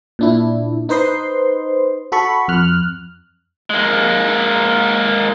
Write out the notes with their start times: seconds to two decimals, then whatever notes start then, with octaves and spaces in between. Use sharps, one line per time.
0.19 A#2 D4 E4
0.89 D#4 B4 C5 D#5 C6
2.12 F#4 A4 B5 C#6
2.48 F2 F6 F#6
3.70 G#3 A#3